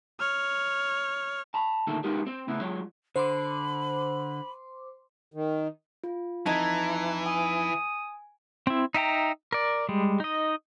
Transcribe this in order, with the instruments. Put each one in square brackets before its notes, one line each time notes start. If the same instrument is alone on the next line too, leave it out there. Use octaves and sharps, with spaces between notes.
[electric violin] C#5 F6
[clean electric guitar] A5 B5
D2 A#2 D#3 A3 A4
G#3 B3 D#4 F4 G4 A#4
C4 C5
A2 C#3 B3 E4
F#3 G#3 F4 C#5
[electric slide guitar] D3 [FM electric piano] C5 C6 D6 [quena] B5
[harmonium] D#3
[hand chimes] F4
[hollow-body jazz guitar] F2 D#4 [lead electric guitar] E3 [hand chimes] A5 A#5 G#6
[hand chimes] G#5 [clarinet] D#6
[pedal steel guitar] C4 E4
D#4 E5 G5 A#5
A#4 D5
G3 G#3
D#4 D#5